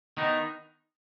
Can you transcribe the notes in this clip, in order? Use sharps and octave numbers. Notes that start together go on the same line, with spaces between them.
D#3 B3 D#4